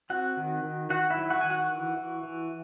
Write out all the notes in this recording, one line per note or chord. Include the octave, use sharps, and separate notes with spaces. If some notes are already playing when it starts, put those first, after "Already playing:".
C4 F#4 F#5
D#3
D#3
D#3 F#4 F#5
E4 E5
F#3
F#4 F#5
D#3 G#5
F#4 F#5
E3
E3
E3